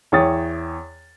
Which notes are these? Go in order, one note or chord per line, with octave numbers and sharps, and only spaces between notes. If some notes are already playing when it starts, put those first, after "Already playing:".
E2 C#5 G5 D#6 A6